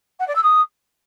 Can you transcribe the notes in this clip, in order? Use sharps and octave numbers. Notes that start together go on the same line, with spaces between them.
F#5
D5
E6
D#6